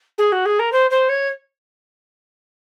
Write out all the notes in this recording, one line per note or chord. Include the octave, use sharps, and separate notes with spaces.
G#4
F#4
G#4
A#4
C5
C5
C#5